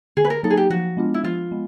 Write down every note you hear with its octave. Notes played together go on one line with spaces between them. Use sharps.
D3 G#4
B4
A#4
F#3 A#3 D#4 A4
G#4
G4
F3 F#4
G#3 B3 D4 F4
E4
F3 F4
G#3 B3